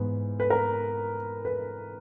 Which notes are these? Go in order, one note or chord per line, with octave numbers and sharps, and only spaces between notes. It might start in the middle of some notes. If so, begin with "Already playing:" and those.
Already playing: G#2 E3 B3
B4
A#4
B4